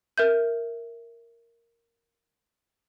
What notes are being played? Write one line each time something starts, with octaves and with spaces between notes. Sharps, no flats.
A#4 E5 G6